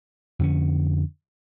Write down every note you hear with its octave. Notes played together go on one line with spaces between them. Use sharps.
F2 D3 C4 C#4